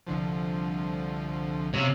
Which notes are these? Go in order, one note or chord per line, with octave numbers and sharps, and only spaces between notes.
C2 D3 F3
C3 C#5 F5